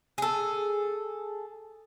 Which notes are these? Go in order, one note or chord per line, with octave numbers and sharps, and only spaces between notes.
G#4 A4